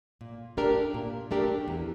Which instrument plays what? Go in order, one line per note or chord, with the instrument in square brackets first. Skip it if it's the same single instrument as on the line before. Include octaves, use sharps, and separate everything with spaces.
[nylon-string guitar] A#2
A3 D4 G4 A#4
A#2
A3 D4 G4 A#4
E2